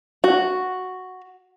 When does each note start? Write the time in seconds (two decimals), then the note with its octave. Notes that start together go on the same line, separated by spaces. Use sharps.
0.24 F#4